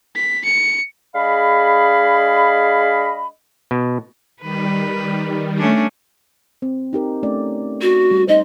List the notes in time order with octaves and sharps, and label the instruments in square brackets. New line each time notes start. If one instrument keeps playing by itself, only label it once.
[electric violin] B6
C#7
[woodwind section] G#3 D4 G#4 D#5 F5 B5
[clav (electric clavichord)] B2
[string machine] D#3 G3 [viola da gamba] B4
[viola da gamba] A3 C#4 D4
[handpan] C4
D#4 G4 A#4
A3 C#4 D5
[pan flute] F#4
[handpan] G3
[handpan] D#4 C5 [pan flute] D#5